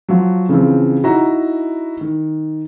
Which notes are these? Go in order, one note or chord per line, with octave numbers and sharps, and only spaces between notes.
F3 F#3
C#3 E3 F3 C4
D#4 E4 F#4 A#5
D#3